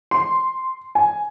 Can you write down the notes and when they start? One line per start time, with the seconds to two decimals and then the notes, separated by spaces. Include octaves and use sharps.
0.11 C6
0.95 G#5